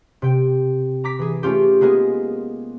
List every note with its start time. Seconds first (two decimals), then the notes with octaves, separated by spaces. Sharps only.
0.22 C3 G5
1.04 A#5 D6 B6
1.19 E3 G#4
1.43 A3 C#4 F4 G4
1.81 G#3 A#3 B3 G#4